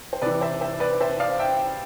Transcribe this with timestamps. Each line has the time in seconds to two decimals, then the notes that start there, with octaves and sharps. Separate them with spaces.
0.13 C5
0.22 C3 E3 B4 D5
0.41 C5 E5
0.61 C5 E5
0.80 B4 D5
1.00 C5 E5
1.20 D5 F5
1.39 E5 G5